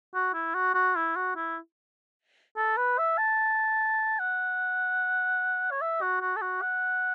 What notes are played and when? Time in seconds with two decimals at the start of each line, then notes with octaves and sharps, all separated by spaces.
0.14 F#4
0.34 E4
0.54 F#4
0.74 F#4
0.96 E4
1.16 F#4
1.36 E4
2.56 A4
2.77 B4
2.98 E5
3.18 A5
4.19 F#5
5.71 C#5
5.81 E5
6.02 F#4
6.21 F#4
6.36 A4
6.41 F#4
6.61 F#5